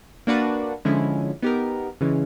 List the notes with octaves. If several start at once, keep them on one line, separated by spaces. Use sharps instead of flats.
A#3 D4 F#4 B4 D5
D3 F3 G#3 C#4 E4
B3 D#4 G4 A#4
C#3 E3 G#3 C#4